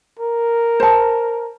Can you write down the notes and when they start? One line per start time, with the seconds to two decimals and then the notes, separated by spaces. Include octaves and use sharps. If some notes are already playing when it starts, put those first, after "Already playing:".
0.19 A#4
0.80 C5 A5